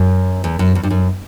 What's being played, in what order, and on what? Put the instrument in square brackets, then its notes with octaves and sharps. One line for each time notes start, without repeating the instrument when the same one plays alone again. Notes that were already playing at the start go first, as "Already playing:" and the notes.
Already playing: [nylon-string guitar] F#2
E2
F#2
E2
G2
F#2